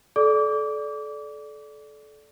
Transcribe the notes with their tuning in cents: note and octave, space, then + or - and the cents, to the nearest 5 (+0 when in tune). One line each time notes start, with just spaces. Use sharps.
A4 -30 D5 -5 D6 -30